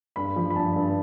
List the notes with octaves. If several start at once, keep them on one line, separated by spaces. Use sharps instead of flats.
G2 B5
F3
B5
G2 A5
G2